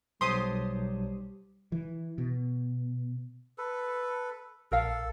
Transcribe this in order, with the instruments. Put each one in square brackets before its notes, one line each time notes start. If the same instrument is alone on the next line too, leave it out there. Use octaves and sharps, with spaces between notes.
[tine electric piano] B1 C#5 [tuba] G3 [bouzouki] G4 C5 A5 [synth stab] C6 D#6
[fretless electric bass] E3
B2
[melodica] A4 B4
[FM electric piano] A#1 [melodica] A4 [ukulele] A#4 F5